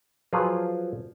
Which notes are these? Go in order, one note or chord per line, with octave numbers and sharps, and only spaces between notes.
F3 F#3 F4 G#4 B4